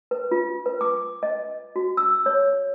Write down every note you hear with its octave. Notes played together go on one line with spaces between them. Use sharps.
B4
F4
B4
D6
D#5
F#4
E6
C#5